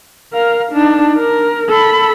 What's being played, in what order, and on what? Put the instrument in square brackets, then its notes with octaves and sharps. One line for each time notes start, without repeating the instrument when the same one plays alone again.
[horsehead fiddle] A#4 F5
D4 D#4
A#4
A4 B5